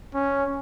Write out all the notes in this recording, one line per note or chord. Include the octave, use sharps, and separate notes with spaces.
C#4